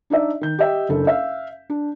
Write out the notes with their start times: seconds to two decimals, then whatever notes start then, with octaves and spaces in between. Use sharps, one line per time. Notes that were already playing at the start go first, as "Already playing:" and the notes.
0.10 D4 D#4 D5 E5
0.41 D#3 G6
0.59 G4 D#5 E5 G5
0.89 F#1 D4 A4
1.07 E5 F5
1.70 D4